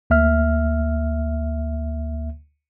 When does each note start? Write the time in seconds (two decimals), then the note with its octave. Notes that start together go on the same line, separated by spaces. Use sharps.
0.10 D2 A#3 E5 F6